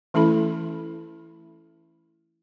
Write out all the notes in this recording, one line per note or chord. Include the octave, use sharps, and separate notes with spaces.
E3 A3 C#4 E4 A4 B5